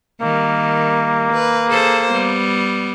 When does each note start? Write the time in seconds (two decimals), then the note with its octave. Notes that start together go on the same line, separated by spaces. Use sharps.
0.21 D#3 G3 A#3
1.33 B4
1.68 G#4 A4 C5
2.11 G3 B3